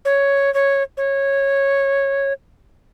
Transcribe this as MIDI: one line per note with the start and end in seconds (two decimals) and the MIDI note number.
0.05 0.53 73
0.54 0.83 73
0.97 2.33 73